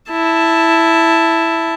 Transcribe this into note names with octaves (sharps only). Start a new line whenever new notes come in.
E4 A5